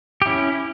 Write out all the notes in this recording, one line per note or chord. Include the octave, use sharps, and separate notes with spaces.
G4
C#4 E4